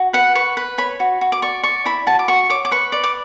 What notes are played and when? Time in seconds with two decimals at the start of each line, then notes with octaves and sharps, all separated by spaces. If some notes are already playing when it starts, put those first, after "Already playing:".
Already playing: F#4
0.13 B4 F#5
0.35 B4 C#6
0.57 B4
0.78 C#5 B5
1.00 F#4
1.21 F#4
1.32 D6
1.42 D5 C#6
1.63 D5 C#6
1.85 E4 B5
2.07 F#4 A5
2.19 D6
2.28 F#4 C#6
2.50 C#5 D6
2.65 D6
2.71 B4 C#6
2.92 D5
3.04 D6